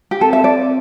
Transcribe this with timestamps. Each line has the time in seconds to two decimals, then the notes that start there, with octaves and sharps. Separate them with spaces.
0.11 G4
0.20 C4 A4
0.33 E5
0.38 C4
0.44 D5
0.56 C4